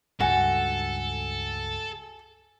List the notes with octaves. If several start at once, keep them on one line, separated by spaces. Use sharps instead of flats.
C#2 G2 F#4 A4 G#5